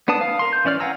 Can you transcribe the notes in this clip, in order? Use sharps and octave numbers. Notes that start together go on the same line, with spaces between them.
B3 D4 B4 A5 D#6
F5
A#4 C6
G6
E3 C#4 D5 F6
F5 F#5 G#5 A#5 E6